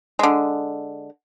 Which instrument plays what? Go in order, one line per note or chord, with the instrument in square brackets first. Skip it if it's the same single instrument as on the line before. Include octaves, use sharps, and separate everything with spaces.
[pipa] D3 G#3